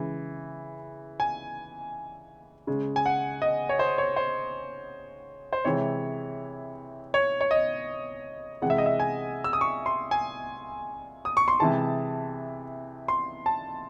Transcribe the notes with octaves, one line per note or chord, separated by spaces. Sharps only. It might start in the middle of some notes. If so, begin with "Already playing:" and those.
Already playing: C#3 E3 G#3
G#5
C#3 G#3
G#5
F#5
D#5
C#5
C5
C#5
C5
C5
C3 E3 G#3 C#5
C#5
C#5
D#5
C3 E3 G#3 F#5
E5
D#5
E5
G#5
E6
D#6
C#6
C6
G#5
D#6
C#6
C6
C3 E3 G#3 A5
C6
A5